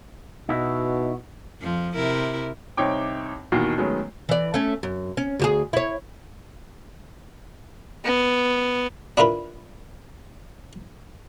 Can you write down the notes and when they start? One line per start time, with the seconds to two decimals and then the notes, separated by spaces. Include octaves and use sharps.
0.49 B2 D#4 E4 F#4
1.61 F2 F3
1.94 C3 E4 A#4
2.77 C2 C4 D#4 C#5 G5 D6
3.52 D#2 B2 D#3 E3 F#4 C7
3.77 D#3 F#3 G#3 A3 B3 C#4
4.29 E3 D5
4.54 A3 C#4
4.83 F#2
5.17 C#4
5.39 D2 G4 G#4
5.73 E4 C#5
8.04 B3
9.17 D4 E4 F4 A#4 B4